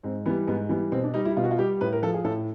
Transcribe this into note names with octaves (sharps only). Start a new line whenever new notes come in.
G#2 C4
E3 G3 B3
G#2 B3
E3 G3 B3
B2 C4
D4
G3 D#4
E4
B2 F4
F#4
F4
G3 G4
A2 B4
A#4
F3 A4
G#4
A2 A4